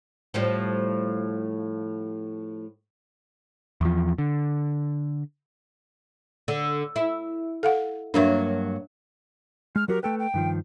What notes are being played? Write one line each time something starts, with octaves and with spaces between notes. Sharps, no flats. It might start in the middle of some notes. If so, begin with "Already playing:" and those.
A2 F3 G3
E2 F3
D3
D3
E4
A4 F5 F#5
G2 F#3 A#3 D4 E5
G#3 F6
F#3 F#4 G4 A#4
A3 A4 B4 G5
G5
G2 D#3 F3